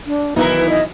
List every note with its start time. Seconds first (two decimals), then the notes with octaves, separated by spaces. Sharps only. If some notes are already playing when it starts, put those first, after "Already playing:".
0.06 D4
0.36 B1 D#3 E3 D#4 E4 A#4 B4
0.69 D#5